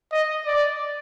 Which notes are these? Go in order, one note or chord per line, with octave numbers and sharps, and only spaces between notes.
D#5
D5